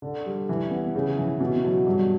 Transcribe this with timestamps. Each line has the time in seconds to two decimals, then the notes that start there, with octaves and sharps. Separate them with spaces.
0.02 D3
0.26 G3
0.49 E3
0.71 B3
0.95 C#3
1.17 E3
1.40 B2
1.64 F#3
1.87 G2